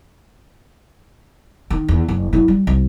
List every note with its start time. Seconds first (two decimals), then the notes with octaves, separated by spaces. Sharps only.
1.70 D#3
1.88 E2
2.08 F#1
2.33 F#2 E4
2.48 G3
2.67 C2